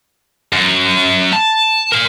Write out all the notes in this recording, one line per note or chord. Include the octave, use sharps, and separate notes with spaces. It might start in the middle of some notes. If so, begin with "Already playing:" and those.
F#2
A5
A#4 C6